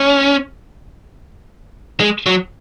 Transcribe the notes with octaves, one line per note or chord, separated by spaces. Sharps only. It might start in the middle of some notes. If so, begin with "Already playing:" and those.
Already playing: C#4
G#3
F#3